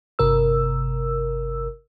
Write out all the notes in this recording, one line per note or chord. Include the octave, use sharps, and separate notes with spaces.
G1 C3 A#4 E6